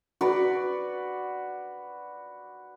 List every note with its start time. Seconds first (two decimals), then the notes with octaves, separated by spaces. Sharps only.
0.21 F#4 B4 D5